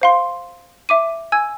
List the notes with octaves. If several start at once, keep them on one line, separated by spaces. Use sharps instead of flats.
C5 F5 C6
E5 D6 D#7
G#5 E6 G#6